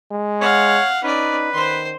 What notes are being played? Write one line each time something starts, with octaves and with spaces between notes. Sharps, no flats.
G#3
C#5 F5 F#5
C#4 D#4 B4 D5
D#3 C5 C6